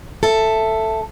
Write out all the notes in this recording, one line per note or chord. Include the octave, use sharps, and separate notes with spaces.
A4 E5